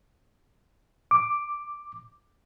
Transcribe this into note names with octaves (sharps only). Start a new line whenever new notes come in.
D6